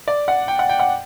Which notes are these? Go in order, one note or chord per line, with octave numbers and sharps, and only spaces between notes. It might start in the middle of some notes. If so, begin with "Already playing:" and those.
D5
F#5
G5
F#5
G5
F#5